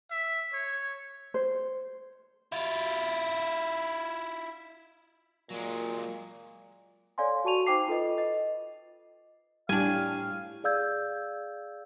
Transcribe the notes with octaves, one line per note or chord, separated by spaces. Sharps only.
E5
C#5
C5
E4 F4
A#2 F#3 G#3
A4 C#5 D5 F5 G#5 C6
F#4 A5 C#6 D#7 F7
D#4 C5 G5 D6 C7 F7
F4 A4 B4 D#5
D#5
A2 G3 D4 G4 F5 G#5
G#4 D5 F5 E6 G6 G#6